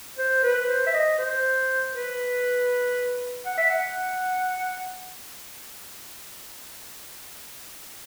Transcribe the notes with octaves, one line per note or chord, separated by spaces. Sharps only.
C5
B4
C5
E5
D#5
C5
B4
F#5
E5
F#5